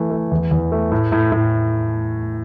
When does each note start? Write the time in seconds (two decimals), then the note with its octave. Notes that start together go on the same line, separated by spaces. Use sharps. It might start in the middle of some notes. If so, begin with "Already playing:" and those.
Already playing: E3 A3
0.11 A3
0.31 E2
0.51 E2
0.72 A3
0.92 A2
1.12 A2
1.32 A2